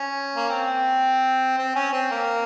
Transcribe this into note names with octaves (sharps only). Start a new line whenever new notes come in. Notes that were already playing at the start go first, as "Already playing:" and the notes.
Already playing: C#4
A#3
C4
C4
C#4
C4
A#3